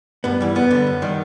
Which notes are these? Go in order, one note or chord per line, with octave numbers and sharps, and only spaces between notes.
G2 B3
E3 G3
F#2 B3
D3 G3
F#2
D#3 G3